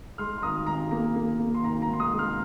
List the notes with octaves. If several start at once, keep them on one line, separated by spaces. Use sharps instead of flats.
G#3 C6 F6
C6
G#1 A#5 D#6
G#1 A#5
A#3 A#5
A#3
A#3
C6
G#1 A#5
A#5
G#2
C6
A#5 D#6
G#3
C6 F6